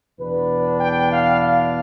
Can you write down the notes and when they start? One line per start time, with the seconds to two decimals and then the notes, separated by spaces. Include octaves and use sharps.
0.19 E2 B2 B3 D4 B4
0.80 G5
1.11 F5
1.41 F5